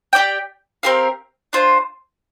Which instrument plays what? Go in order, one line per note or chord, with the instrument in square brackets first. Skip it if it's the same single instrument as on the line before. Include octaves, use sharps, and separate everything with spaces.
[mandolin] G4 D5 G5
C4 G4 A#4 F5
D4 F4 C5